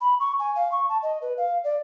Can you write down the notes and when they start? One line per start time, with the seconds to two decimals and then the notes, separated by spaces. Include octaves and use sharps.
0.01 B5
0.20 C#6
0.39 G#5
0.56 F5
0.72 C#6
0.89 A5
1.03 D#5
1.22 B4
1.37 F5
1.64 D5